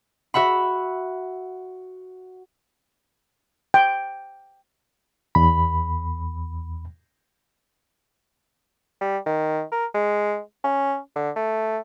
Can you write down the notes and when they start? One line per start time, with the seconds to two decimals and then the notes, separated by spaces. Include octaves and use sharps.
0.34 F#4 E5 F#5 B5
3.74 G5
5.35 E2 B5
9.01 G3
9.26 D#3
9.71 A#4
9.94 G#3
10.64 C#4
11.15 D3
11.36 A3